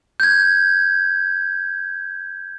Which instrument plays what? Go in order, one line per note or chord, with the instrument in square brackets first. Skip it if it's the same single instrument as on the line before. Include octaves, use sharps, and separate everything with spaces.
[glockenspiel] G6 G#6